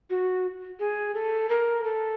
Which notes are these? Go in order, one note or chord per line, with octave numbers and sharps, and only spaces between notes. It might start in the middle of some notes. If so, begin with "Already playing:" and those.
F#4
G#4
A4
A#4
A4